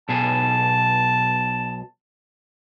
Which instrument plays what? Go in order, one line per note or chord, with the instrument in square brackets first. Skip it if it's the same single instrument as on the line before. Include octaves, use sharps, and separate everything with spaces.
[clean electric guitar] B1 B2 G#4 [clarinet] A5